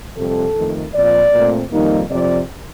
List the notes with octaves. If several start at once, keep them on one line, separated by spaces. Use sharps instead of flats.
F2 C3 G3 A4
F2 D#3 A3
A#2 F3 C4 D5
A#2 A3 C4
F2 D#3 G3 A#3 D#4
F2 C3 F3 D5